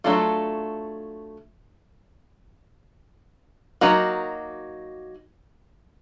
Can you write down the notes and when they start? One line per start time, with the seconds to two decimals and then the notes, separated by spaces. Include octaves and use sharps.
0.04 F#3 A3 D4 F4 A4
3.81 F#3 A#3 D#4 F#4